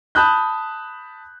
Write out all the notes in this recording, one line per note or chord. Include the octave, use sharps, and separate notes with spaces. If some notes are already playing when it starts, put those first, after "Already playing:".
A5 B5 D#6 F#6 G6